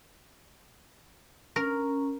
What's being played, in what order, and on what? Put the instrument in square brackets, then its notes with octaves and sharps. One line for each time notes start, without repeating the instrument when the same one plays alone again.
[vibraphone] C#4 [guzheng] A#4